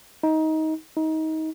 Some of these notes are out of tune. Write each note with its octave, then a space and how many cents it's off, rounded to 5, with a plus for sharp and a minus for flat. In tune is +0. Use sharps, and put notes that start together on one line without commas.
D#4 +20
D#4 +25